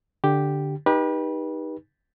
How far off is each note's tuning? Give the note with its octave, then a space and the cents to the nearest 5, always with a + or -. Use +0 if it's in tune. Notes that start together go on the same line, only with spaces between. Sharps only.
D3 +0 G4 +0
D#4 +0 G4 +15 B4 -30